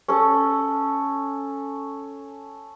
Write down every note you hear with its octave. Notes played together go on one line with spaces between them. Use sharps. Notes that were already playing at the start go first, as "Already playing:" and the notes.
C#4 A4